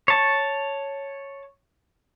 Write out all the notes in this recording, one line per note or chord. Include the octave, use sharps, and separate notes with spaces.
C#5 A5